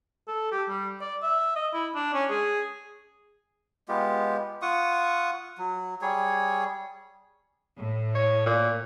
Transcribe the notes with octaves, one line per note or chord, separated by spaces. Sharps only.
A4
G4
G3
D5
E5
D#5
E4
D4
C#4
G#4
G#3 B3 F4 G4
F4 F#5 C#6 D#6
F#3
G3 G#4 C#5
A2
C#5
A#2